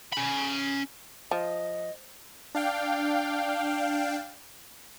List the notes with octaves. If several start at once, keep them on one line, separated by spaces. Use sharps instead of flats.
C#4 B5
F3 D#5
D4 F5 G5